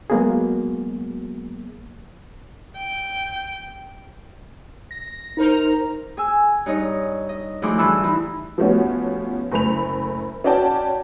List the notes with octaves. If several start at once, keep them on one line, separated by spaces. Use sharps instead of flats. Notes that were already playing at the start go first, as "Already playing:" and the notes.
F#3 G#3 A#3 B3 F#4 G#4
G5
A#6
D#4 A#4 C5 A#5
G#4 G#5 E6
G2 D#4 C#5 D#5
D#5
D2 F3 E4 G#4 C6 D6
G2 E3 A5 B5 C#6 E6
E3 D#4 E4
F3 G3 A3 B3 C#4 F#4
F#1 A3 B5 F7
C#4 F#4 D5 G5 A5